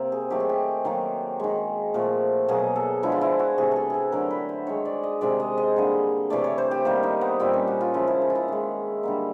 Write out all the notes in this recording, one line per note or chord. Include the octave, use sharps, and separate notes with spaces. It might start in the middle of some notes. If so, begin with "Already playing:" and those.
Already playing: C3 A#3 C4
G#4
D#3 F#3 A3 G4
G#4
G4
D#3 F#3 A#3
D#3 G#3
A#2 F3 A3
B2 F#3 A#3 G#4
A4
D3 F3 G#3 E4
F4
E4
F#4
C3 E3 A3 G#4
G#4 A4
G#4 A4
D3 F#3 A3 A#4
B4
C5
D#3 G#3 C#5
D5
D#5
C3 D#3 G#3 D5
D#5
D#5
D3 G3 A#3
C3 E3 A3 D5
C#5
C5
G4
D#3 G3 A#3
D#4
B3
A#2 G3 A#3 C4
C#4
F#4
F4
C#3 F3 G#3 E4
E4
D#4
F4
E4
D#3 G#3
D3 G3 A#3